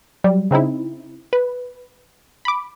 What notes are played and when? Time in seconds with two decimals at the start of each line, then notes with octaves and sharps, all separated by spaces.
0.24 F#3 G3
0.51 C#3 C4 D#4 E4
1.33 B4
2.45 B5 D6